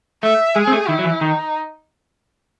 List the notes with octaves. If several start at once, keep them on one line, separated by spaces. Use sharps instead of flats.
A3 E5
G#3 G#4
C4
A3
D#3 E4
F#3
E3
D#3 D#4